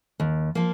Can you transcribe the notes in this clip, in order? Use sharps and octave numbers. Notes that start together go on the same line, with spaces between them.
D#2
F3 A#3